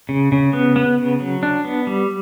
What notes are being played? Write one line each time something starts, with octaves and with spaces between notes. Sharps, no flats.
C#3
C#3
B3
B3
C#3
F#3
D4
B3
G3